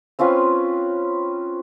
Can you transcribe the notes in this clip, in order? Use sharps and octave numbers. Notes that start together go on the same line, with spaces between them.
C4 C#4 F4 B4